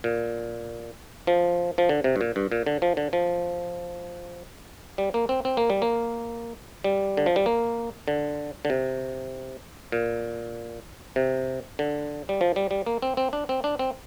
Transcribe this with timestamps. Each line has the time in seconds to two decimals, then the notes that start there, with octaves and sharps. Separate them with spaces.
0.04 A#2
1.27 F3
1.78 F3
1.89 D3
2.04 C3
2.16 G2
2.21 A#2
2.36 G2
2.52 A#2
2.67 D3
2.82 F3
2.97 D3
3.13 F3
4.98 G3
5.14 A#3
5.29 C4
5.45 C4
5.57 A#3
5.70 G3
5.82 A#3
6.84 G3
7.17 D3
7.26 F3
7.36 G3
7.46 A#3
8.08 D3
8.65 D3
8.70 C3
9.92 A#2
11.16 C3
11.79 D3
12.29 G3
12.41 F3
12.56 G3
12.71 G3
12.86 A#3
13.02 C4
13.17 C4
13.33 D4
13.49 C4
13.64 D4
13.79 C4